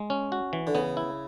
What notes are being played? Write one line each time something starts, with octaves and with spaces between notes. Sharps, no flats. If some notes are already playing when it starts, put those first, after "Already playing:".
Already playing: G#3
C#4
F#4
E3
D3
C#3 B3
E4